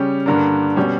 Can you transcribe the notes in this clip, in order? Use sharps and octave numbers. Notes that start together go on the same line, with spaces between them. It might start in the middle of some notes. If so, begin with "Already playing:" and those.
Already playing: C#3 G3 C#4 G4
G2 D3 A#3 D4 A#4
B2 G3 C#4